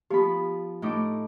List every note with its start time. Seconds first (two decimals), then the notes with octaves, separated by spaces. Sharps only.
0.10 F3 B3 G4 B5
0.82 A2 D#4 D6